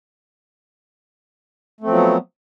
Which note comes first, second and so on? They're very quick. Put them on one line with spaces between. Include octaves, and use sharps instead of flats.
A3 C4 F3 F#3 B3